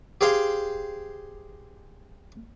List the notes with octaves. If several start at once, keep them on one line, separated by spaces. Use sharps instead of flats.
G4 G#4 C5 F5 G5